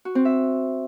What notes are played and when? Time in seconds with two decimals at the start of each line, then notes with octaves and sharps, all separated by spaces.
0.05 F#4
0.15 C4
0.25 E5